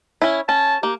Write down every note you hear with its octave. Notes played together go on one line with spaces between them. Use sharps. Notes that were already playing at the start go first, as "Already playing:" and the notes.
C#4 E4
C#4 A5
A#3 G4